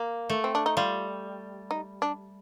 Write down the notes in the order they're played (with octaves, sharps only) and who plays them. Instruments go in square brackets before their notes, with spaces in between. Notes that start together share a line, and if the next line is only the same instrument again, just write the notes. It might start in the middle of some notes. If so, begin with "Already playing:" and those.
Already playing: [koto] A#3
A3
[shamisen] C4
D4
D#4
[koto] G3 [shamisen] F4
[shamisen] D#4
D4